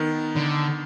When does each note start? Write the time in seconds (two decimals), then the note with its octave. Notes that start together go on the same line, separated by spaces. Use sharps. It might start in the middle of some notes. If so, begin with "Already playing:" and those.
Already playing: D#3 B3
0.35 D3